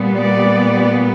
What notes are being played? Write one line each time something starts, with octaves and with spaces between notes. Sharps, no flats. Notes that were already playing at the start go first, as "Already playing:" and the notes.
Already playing: A#2 G3 B3
D5